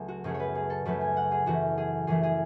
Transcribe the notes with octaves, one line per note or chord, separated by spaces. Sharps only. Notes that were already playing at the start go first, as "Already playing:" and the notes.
Already playing: C#2 F#3 A3
F#4
F#2 C#3 F#3 A3 G#4
C#5
B4
G#4
A4
F#2 C#3 F#3 A3 B4
G#5
F#5
G#4
F#2 E3 A3 F#4
G#4
F#2 E3 A3 G#4
G#4